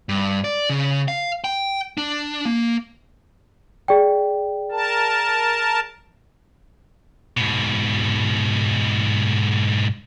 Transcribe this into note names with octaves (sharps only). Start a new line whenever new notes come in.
G2
D5
C#3
F5
G5
D4
A#3
G#4 D5 G5
A#4 A5
G#2 B2